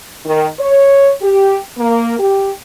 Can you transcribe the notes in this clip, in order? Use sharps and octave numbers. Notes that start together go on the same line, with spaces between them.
D#3
C#5
G4
A#3
G4